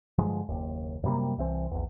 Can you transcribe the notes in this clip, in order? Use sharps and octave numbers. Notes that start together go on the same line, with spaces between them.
G2 D3 F3 G#3
F#1 D#2
F#2 C3 G3 A#3
C2 E3 C4
A#1 E2